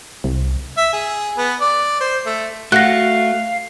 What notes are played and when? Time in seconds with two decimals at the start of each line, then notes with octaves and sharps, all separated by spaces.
0.24 C2
0.77 E5
0.93 G#4
1.37 B3
1.60 D5
2.00 C5
2.26 A3
2.72 A3 F#4 F5 F#6 A#6